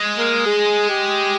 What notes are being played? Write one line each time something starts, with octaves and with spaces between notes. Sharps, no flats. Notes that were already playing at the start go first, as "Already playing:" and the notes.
Already playing: G#3
A#3
G#4
G4